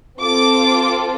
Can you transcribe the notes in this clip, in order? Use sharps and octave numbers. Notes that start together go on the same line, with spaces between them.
C4 F4 A4 D6